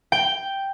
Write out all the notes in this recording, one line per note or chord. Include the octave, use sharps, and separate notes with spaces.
G5